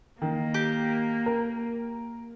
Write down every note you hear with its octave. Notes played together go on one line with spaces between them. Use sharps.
D#3 A#3
G4
A#4